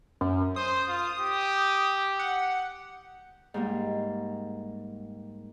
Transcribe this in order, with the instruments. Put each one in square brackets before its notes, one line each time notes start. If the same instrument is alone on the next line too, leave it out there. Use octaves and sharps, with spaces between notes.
[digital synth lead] F#2
[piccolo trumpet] C5 [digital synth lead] D#6
[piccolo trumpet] F4
G4
[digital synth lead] F#5
[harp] G#2 G3 A#3